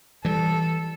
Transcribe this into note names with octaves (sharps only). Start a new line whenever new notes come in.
E3 G3 A4